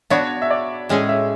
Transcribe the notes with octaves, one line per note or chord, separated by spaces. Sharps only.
B3 D4 F#4 C#5
E5
D5
A2 G#3 C#4 G#4
E5